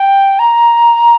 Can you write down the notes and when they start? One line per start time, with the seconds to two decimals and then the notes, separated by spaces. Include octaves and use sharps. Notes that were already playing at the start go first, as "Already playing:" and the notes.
Already playing: G5
0.39 A#5